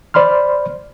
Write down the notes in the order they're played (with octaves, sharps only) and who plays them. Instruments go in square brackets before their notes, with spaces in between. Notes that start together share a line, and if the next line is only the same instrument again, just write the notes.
[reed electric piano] C5 D5 B5 C6 F6